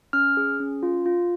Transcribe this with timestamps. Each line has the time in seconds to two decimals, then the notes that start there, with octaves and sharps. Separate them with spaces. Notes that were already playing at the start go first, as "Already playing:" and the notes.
0.13 C#4 F6
0.37 G#4
0.60 C#4
0.83 F4
1.06 F4